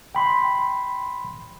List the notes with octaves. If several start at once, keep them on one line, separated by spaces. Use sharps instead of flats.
G5 B5 C6